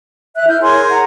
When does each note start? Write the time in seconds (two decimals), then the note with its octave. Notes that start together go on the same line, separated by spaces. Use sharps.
0.36 E5 F#6
0.48 E4 F6 G6
0.61 G#4 A#4 C#5 G#5 C6
0.89 F#5 A#5